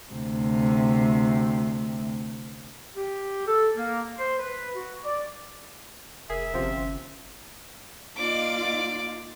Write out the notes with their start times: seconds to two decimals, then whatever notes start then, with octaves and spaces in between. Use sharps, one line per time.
0.13 D2 C3
2.96 G4
3.47 A4
3.75 A#3
4.17 C5
4.39 B4
4.75 F#4
5.04 D5
6.30 F1 G#4 A#4 E5
6.54 G1 C3 F3 C4 C#4
8.17 A#3 D#4 F4 D5 D6